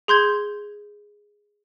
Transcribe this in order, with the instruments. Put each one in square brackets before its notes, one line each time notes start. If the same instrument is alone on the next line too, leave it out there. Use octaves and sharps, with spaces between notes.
[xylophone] G#4 C6 G6 G#6